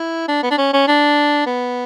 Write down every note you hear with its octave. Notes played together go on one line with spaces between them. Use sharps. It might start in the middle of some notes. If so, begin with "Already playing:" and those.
Already playing: E4
D4
B3
D4
C#4
C#4
D4
B3